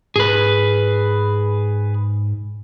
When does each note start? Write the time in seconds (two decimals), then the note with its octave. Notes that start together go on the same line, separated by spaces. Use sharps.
0.16 G#2 G#4 B4